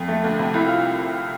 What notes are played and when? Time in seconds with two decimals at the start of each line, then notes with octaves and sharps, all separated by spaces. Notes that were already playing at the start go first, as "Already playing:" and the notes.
Already playing: F2
0.08 A3
0.24 D2
0.39 C3
0.54 C2 E4
0.66 F4